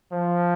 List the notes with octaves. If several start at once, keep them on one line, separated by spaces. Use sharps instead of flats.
F3